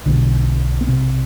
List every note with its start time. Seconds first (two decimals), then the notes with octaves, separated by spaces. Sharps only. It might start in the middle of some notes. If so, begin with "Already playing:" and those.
0.06 B1 B2 D3 D4
0.81 B3
0.87 C3 C4